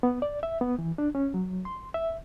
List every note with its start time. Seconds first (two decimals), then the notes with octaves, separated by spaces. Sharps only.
0.03 B3
0.22 D5
0.43 E5
0.61 B3
0.79 E3
0.98 D4
1.15 C#4
1.34 F#3
1.65 C6
1.94 E5